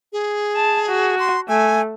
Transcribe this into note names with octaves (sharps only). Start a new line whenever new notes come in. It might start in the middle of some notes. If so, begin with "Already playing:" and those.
G#4
A5
F#4
C6
A3 G#5